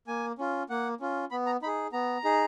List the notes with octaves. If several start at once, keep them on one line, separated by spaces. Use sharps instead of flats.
A#3 G#5
C#4 F4
A#3 F#5
C#4 F4
B3 B5
A#5
D#4 G#4 B5
B3 A#5
D#4 G#4